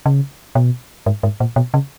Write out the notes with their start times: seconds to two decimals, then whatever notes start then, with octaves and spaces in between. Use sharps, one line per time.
0.06 C#3
0.55 B2
1.06 G#2
1.23 G#2
1.40 A#2
1.56 B2
1.74 C#3